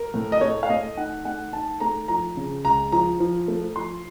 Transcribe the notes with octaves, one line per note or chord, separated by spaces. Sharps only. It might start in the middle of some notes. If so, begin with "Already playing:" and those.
Already playing: A#4
A2
D#5
A3 C#5
F5
A3 D#5
D#4 F#5
A3 F#5
D#4 A5
A3 A#5
F3 A#5
C#3
C#2 A#5
F3 A#5
F3
A3
F3 C6